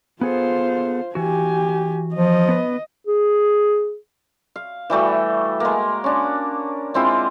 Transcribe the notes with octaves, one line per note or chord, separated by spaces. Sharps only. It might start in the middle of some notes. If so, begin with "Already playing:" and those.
B3 F4 G#4 A4 C5
E3 F#4 G4 G#5
F3 D#5
B3 B4
G#4
F5
E3 G3 A3 F#4
G#3 A#3
C#4 D4
G#3 C4 E4 F4